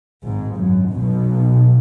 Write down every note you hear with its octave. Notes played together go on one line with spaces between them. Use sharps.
G#1 G#2
F#2
B1 B2